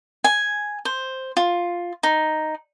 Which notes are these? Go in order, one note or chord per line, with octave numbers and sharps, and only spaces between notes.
G#5
C5
F4
D#4